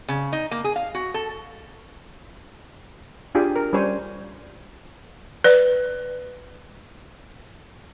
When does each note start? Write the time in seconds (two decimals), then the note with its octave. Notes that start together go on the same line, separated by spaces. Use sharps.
0.08 C#3
0.33 D#4
0.51 A#3
0.64 G#4
0.76 F5
0.95 F#4
1.14 A4
3.35 D4 F4 G4 G#4 G#5
3.56 A#4
3.73 G3 C#4 G4 C5 C#5 G#5
5.44 B4 D5